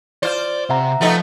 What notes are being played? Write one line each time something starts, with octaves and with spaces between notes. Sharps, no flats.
F4 C5 D5
C3 E5 F#5 A#5
F3 A3 B3 D#4